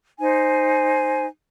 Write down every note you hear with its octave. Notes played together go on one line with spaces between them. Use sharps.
D#4 C5 G#5